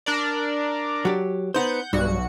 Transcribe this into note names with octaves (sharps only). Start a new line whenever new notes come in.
D4 A#4 D5
F#3 G4
B3 D#4 C5 F#5 G6
B1 G2 F#4 C#7